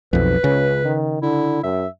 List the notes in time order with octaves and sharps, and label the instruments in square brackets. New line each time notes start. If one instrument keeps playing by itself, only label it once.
[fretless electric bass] B1 F2 [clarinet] B4
[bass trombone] C#2 [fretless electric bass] C#3
[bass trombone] D#3
[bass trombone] D3 [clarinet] E4
[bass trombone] F#2 [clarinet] E5